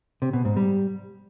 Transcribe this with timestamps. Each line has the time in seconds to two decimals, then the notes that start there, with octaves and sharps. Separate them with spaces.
0.22 C3
0.33 B2
0.45 G#2
0.57 G3